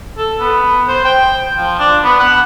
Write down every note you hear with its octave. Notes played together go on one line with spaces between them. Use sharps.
A4
B3
C5
G5
F3
D4
B3
F#5